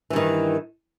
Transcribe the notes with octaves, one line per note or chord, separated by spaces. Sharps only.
G2 D#3 E3